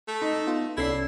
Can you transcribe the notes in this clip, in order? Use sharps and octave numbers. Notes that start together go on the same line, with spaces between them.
A3
D#4
B3 F4
C2 C#4 E4 A4 D5 C7